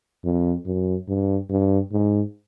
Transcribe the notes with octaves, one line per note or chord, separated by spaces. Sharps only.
F2
F#2
G2
G2
G#2